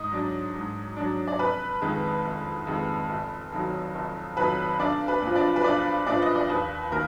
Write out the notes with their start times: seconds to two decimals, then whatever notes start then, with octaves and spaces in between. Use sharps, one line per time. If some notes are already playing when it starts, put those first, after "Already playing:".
Already playing: G#2 D#4 D#5
0.12 F#3 D4
0.55 G#2
0.96 F#3 D4
1.27 D5
1.39 F1 B4
1.81 F2 D#3 G#3
2.24 F1
2.67 F2 D#3 G#3
3.09 F1
3.52 F2 D#3 F#3
3.94 F1
4.37 F2 D#3 F#3 B4
4.79 B1 D4 D5
5.08 B4
5.22 A#2 F3
5.36 D4 D5
5.56 B4
5.64 B1 D4 D5
6.07 A#2 F3 D4 D5
6.22 D#5
6.35 D5
6.49 D#2 B4
6.91 D#3 A#3 A#4